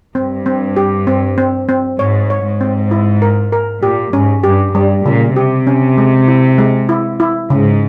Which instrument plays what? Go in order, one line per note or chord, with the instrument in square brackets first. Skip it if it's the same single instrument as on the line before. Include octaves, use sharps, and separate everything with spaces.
[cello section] G2 [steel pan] C4
[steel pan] C4
G4
C4
C4
C4
[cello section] G#2 [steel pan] C#5
[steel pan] C#5
[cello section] G#2
[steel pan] C4
E4
A#4
A#4
[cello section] A#2 [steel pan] G4
[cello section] G#2 [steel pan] C#4
[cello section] G2 [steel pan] G4
[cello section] G2 [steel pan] G3
[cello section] A#2 [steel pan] C#3
[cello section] C3 [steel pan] G4
[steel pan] C#4
G#3
E4
G#3
E4
E4
[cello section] G#2 [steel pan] C#3